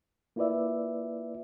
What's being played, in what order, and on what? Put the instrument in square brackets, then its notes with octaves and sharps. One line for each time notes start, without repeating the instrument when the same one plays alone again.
[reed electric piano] A#3 E4 F4 B4 D5 E5